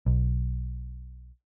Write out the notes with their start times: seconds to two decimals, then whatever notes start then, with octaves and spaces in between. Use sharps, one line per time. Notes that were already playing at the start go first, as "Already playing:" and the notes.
0.06 B1